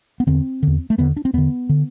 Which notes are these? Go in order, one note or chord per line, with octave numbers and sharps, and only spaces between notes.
B3
E2 D3 C4
E2 D3
A3
E2 D3 B3
D4
C4
E2 D3 B3
D3